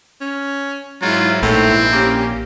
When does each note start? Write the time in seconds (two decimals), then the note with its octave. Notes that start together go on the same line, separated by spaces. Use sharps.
0.21 C#4
1.02 G#2 F#3 E4 F4
1.42 A#1 A2 C4
1.93 A#3 C#4 G4